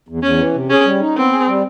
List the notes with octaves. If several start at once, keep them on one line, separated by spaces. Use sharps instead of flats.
E2
E2 C#4
E3
C3
C#4 G#4
G3
D#4
B3 C4
G#4
G3